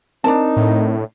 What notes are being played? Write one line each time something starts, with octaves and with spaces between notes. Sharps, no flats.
C4 D4 D#4 A#4 A5
A2